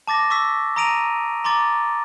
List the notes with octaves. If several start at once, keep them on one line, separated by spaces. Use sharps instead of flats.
A5 D6 A6 A#6
C#6 D6 E6 B6
A#5 D#6 A#6 D7 D#7 F7
A#5 C6 D6 A6